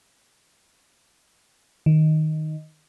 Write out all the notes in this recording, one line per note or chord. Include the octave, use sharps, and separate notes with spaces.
D#3